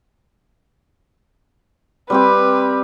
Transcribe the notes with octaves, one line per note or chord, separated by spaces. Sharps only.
G3 C4 G4 B4